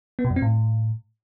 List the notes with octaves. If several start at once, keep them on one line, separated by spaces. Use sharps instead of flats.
B3
B2
F#2
C4
A2